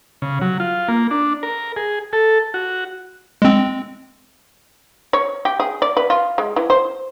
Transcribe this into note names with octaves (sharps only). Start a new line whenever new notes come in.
C#3
F#3
F4
A#3
D4
A#4
G#4
A4
F#4
G#3 C4
C#5
G4
G#4
D5
B4
F4
G#3
E3
C5